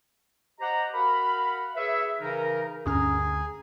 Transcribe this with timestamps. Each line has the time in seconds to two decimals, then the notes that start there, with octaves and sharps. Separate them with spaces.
0.60 G4 C5 D#5 F#5 A#5
0.94 F#4 A#4 F5 F#5 B5
1.76 G#4 B4 C#5 E5
2.20 C#3 E3 D#4 A#4
2.86 D2 G2 C#4 G#4 A#5 D#6 F6